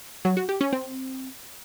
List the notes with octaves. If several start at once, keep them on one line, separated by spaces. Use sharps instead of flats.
F#3
F#4
G4
C#4
C4